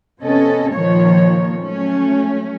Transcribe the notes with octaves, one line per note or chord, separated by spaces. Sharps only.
C3 B3 C#4 A4 D#5
A#2 D#3 F3 A#3 C#5
F#3 A3 C#4